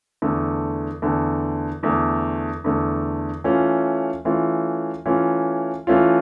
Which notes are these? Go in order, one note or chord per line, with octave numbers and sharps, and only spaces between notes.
E2 D3 A3
E2 D3 A3
E2 D3 A3
E2 D3 A3
E3 A3 C#4 F4
E3 A3 C#4 F4
E3 A3 C#4 F4
E3 A3 C#4 F4